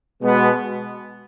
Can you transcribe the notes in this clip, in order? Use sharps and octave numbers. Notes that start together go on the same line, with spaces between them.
B2 G#3 B3